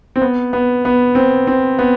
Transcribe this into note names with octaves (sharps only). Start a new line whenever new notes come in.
C4
B3
B3
B3
C4
C4
B3